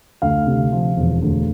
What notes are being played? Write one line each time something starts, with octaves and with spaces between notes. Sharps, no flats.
D2 F5
C3
F3
E1
D2